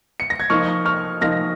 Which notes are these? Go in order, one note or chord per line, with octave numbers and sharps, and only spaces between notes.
C#7
A#6
G#6
F3 A#3 D#4 C#6 F6
C#6 F6
F3 A#3 D#4 F6 A#6